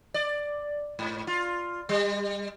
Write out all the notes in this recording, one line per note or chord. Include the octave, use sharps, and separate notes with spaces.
D5
G#2
F4
G3